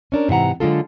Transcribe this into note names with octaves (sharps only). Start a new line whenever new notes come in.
C#4 D4 A#4
G#2 C3 E3 F#5 A#5
D3 F#3 G#3 D#4 F4 A4